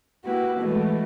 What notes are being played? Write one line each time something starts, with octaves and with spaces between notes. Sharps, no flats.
A#3 E4 F#4 G4 B4
B2 E3 G#3 A3 B3